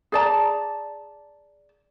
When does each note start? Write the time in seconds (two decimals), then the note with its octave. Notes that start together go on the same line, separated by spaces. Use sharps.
0.12 G#4 D5 A5 A#5